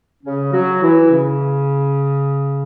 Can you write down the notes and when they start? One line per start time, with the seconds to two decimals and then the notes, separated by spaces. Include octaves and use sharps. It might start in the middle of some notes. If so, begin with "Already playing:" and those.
0.24 C#3 C#4
0.53 F#3 F#4
0.82 E3 E4
1.11 C#3 C#4